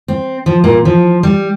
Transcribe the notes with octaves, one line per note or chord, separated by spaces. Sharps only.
C4
F3
A#2
F3
G3